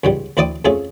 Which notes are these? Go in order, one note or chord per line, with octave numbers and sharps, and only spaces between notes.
C#2 G#2 G3
D2 E4 C5 D5 G5 D#6
F2 F3 A3 C#4 G#4 A4